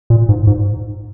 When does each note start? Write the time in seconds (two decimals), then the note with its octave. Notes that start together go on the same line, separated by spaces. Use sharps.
0.10 A#2
0.29 G#2
0.47 G#2